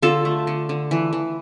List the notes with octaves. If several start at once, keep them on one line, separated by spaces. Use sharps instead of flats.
D3 F4 A4
A3
D3
D3
E3
E3